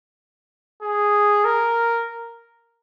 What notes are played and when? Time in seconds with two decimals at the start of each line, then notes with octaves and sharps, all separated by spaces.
0.82 G#4
1.45 A#4